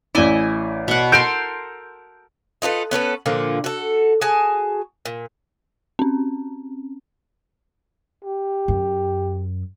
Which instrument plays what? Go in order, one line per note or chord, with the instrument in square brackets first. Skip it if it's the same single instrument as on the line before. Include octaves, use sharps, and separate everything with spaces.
[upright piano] A1 D5 [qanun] E4 D#5 G#5
[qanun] B2 F#5
[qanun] A4 A#4 C6 [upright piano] G6 D7
[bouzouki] D#4 F4 A4 B4
B3 C#4 A4 B4
A#2 D3 F3 A#3
F#4 A4
F#4 G#4 G#5 A5
A#2
[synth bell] C4 C#4
[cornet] G4
[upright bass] F#2